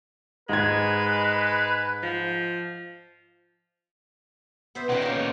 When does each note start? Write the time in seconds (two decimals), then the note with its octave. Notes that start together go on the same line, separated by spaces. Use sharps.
0.49 G#2 G#3 B4 G#6
2.03 F3
4.75 B3 C5 E5
4.90 A#2 C#5 F#5 G5
5.02 C#3 A#3